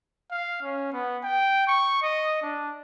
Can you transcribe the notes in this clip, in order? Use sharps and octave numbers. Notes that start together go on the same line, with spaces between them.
F5
C#4
B3
G5
C#6
D#5
D4